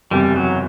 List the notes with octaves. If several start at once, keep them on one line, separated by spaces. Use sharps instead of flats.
F#1 E2 C3 G3
F#3